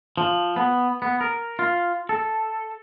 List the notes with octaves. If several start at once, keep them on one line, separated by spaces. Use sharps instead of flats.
F3
B3
B3
A#4
F4
A4